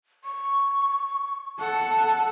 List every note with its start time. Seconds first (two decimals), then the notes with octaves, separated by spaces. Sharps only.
0.24 C#6
1.59 A4 F#5 A5